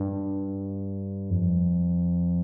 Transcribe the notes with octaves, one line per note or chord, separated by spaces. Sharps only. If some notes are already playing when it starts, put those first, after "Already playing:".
Already playing: G2
F2